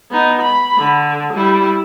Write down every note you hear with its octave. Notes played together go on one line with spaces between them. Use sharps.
B3 D#4
B5
D3
G3 E4